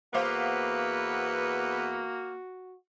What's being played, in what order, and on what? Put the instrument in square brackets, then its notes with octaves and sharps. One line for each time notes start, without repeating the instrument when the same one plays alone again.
[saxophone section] E2 B3 B4 [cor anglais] A#3 [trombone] F#4 [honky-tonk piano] C5 F5 D6